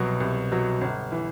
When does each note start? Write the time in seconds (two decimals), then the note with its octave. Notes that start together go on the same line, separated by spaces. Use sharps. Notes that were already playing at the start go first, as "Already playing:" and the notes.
Already playing: C2 B2 F#3
0.20 C2
0.51 B2 F#3
0.81 G1
1.12 E3